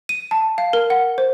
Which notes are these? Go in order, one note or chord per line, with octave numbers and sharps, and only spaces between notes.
D#7
A5
F5
A#4
F#5
C5